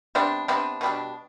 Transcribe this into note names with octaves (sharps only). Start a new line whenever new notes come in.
C3 G3 B3 D4
C3 G3 B3 D4
B2 G3 B3 D4